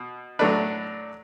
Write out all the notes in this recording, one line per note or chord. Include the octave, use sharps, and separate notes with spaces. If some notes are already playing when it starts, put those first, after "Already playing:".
Already playing: B2
A2 F#3 A3 D4 B4